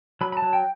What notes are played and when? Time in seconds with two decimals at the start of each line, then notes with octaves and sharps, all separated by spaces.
0.21 F#3 B5
0.32 B5
0.37 A5
0.42 F#3
0.53 G5